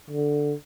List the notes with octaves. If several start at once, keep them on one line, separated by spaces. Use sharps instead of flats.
D3